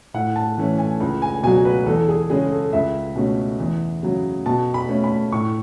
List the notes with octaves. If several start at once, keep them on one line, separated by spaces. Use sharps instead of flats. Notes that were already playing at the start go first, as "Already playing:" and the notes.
A2 F#5
A5
E3 A3 C#4
G#5
C#2
G#5
B2 F#3 G#5
B4
E2 A4
G#4
C#3 G#3 C#4 G#4
A4
C#2 E5
B2 A3 C#4
E2
C#3 F#3
B2 A5
B5
A3 C#4
B5
A2 C#6